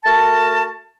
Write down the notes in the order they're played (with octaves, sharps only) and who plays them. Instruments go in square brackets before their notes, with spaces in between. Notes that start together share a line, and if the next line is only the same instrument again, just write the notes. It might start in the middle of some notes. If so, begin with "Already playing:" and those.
[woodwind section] A3 F#4 A#4 A5